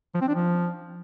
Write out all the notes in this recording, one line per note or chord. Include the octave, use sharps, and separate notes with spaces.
F3
C4
D4
F3